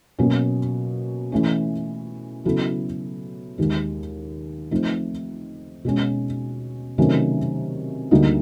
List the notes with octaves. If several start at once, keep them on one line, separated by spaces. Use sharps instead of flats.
B2 F#3 A#3 C#4
E3 A3 C#4
C#3 F#3 B3 E4 A4
D#2 D#3 G#3
F3 A3 C4 D#4
B2 G#3 C#4
C3 D#3 F#3 A3 C#4
D2 D3 G3 A#3 D#4